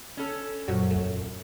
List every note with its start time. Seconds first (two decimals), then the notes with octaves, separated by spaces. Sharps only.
0.17 C#4 A4
0.68 F#2 A#2 F3 F#3
0.91 E2 A3 F4